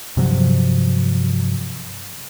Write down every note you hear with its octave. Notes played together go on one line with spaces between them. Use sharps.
G2 C3 F3 F#3